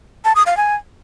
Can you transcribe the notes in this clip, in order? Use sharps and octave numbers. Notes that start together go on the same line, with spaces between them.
A5
D#6
F5
G#5